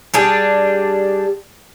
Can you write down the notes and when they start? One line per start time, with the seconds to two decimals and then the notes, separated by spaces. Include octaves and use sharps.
0.14 G3 D4 G#4